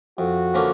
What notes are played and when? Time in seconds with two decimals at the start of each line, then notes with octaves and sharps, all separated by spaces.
0.18 F2 F#4
0.54 D3 F3 A#3 C#4